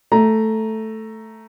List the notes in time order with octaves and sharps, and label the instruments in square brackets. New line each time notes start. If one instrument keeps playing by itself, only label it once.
[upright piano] A3 A#5